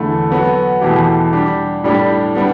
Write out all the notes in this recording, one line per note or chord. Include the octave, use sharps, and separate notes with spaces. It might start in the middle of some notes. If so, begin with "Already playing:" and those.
Already playing: E2 D3 A3 E4
F#3 B3 F#4 A4
E2 B2 A3 E4 G4
G3 D4 G4
A2 G3 D4 G4
G3 B3 D4